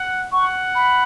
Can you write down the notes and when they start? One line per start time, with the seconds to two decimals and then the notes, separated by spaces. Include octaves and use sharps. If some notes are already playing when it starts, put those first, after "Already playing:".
Already playing: F#5
0.32 F#5 C#6
0.75 B5